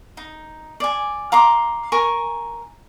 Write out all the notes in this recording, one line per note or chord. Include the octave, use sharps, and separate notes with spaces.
D#4
D5 G#5
F5 A#5 C6 D6
A#4 G#5 C#6